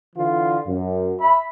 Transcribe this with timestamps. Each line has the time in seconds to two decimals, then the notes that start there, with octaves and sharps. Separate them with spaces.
0.16 D3 E3 F4
0.67 F#2
1.19 E5 B5